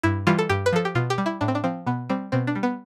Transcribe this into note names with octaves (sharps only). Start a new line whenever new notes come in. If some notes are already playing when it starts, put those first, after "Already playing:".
G2 E4
E3 G3 F4
A4
G2 G4
B4
F3 A4
G4
B2 F4
G4
G3
E4
A2 D4
C4
D4
F3 C4
B2 B3
G3 C4
B2 C4
D4
G3
B3